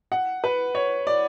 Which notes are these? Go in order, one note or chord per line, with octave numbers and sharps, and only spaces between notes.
F#5
B4
C#5
D5